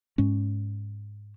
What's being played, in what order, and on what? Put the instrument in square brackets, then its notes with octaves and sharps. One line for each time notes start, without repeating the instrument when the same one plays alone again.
[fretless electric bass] G#2 G#3 C#4